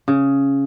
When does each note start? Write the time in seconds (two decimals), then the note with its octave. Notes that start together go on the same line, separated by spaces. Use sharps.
0.08 C#3